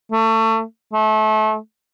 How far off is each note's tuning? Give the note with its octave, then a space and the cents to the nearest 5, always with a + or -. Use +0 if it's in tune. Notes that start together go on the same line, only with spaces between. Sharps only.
A3 +25
A3 -30